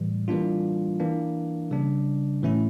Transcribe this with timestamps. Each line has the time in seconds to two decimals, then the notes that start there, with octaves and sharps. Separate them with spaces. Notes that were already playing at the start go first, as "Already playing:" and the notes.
Already playing: A2 E3 G3
0.28 E3 G3 A#3 D4 F4
1.00 E3 A#3 D4
1.71 C#3 G3 D4
2.42 A2 E3 A3 C#4 E4